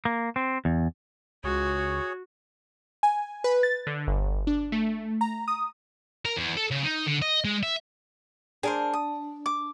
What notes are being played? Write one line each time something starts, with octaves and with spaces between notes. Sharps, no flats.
A#3
C4
E2
C#2 F#4 G#4 C#5
G#5
B4
A6
D3
G1
D4
A3
A#5
D#6
A#4
E2
A4
C#3
D#4
D3
D#5
G#3
E5
D4 G#4 A#4 C5
D#6
D6